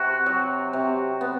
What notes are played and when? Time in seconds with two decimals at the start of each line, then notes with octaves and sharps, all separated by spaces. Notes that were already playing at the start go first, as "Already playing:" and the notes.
Already playing: C3 F#4
0.26 F#3
0.73 C3
1.21 B3